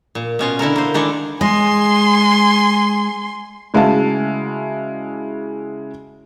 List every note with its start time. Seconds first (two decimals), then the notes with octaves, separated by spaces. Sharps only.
0.15 A#2
0.39 B2 C#4 F4
0.59 D3 E4 A4 A#4
0.76 A#3 C5
0.94 D#3 G#3 D4 E4 A4 D5
1.41 G#3 G#5 C6
3.74 C#3 G#3 E4 F#4 F5 A5